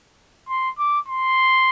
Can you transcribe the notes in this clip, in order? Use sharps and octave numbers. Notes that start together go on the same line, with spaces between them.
C6
D6
C6